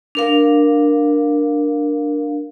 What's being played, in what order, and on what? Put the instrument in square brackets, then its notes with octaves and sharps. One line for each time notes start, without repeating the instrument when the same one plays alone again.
[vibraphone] D4 A#4 F5